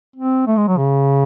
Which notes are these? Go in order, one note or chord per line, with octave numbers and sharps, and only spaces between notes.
C4
A3
G#3
F#3
C#3